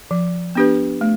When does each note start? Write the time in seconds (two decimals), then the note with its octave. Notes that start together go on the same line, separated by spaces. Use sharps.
0.11 F3
0.55 B3 D4 G4 B4
1.01 A3